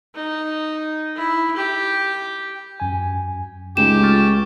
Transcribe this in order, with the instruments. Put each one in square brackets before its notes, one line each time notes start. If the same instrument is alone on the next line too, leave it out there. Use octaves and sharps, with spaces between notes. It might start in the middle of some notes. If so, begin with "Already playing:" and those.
[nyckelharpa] D#4
E4
G4
[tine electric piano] F#2 G#5
[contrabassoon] C#2 [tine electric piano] A3 D#4 F4 [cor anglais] G4 [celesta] E7
[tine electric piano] C#6 F6 A6